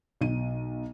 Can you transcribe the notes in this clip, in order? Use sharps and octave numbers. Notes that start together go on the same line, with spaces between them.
B1 D#7